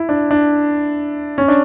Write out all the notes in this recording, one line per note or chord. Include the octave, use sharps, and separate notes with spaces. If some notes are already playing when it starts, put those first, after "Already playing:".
Already playing: E4
D4
D4
C#4
D4